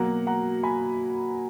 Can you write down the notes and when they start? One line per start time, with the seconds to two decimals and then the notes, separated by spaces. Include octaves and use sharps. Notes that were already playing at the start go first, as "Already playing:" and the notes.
Already playing: B2 F#3 A#3 F#5 A#5
0.27 F#5 A#5
0.63 G#5 B5